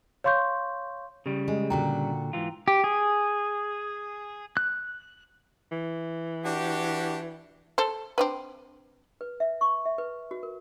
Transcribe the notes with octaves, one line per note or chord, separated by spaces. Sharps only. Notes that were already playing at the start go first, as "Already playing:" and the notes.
C#5 F5 C6 C#6 G6
C#3 G3 G4
G#3
A#2 D3 F#4 G5 A#5
G#2 E3 F4
G4
G#4
F#6
E3
D4 F#4 G4
A4 C5
C4 D4 B4
B4
E5
C#6
E5
B4
F#4
A#4